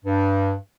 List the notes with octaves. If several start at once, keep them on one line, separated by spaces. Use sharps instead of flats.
G2